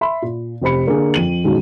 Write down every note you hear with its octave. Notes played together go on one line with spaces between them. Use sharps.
E5 B5 C6
A#2
F1 G4 C5 B5 C#7
D3 A#3 D4 G#4
F2 D#7 F#7
A1 F#2 B2 D#3 G#3